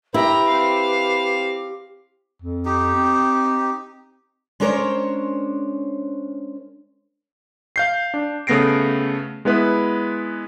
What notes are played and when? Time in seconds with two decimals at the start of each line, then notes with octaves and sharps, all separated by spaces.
0.14 E4 G4 B4 G5 A#5
0.47 C4 F5
2.43 F2
2.65 D#4 G4
2.95 C4
4.60 G#3 C#4 D4 A#4 C5 C#5
7.76 F5 G6 C7
8.14 D4
8.47 C#3 A3 B3 A#6 C7 D7
9.45 G#3 B3 E4 B4